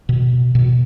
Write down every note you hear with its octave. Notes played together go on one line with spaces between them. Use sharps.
B2
B2